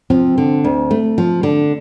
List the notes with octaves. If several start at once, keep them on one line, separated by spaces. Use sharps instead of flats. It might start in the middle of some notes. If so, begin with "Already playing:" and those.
F3 C4
D3
D2
A3
F3
D3